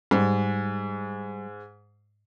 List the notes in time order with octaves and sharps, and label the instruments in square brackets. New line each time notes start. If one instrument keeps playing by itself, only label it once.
[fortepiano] G#2 [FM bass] G3